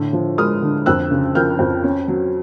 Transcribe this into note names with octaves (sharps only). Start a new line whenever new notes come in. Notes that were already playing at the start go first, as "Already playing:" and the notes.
Already playing: A2 D3
F3
G#3 D#6 F6
D3
F2 E6 F#6
C#3
F3 F6 G6
F2
C#4
F#3